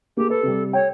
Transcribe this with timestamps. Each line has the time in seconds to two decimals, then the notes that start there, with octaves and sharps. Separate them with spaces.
0.17 A#3 G4 G#4
0.30 A4 B4
0.43 C3 G3
0.73 C#5 G5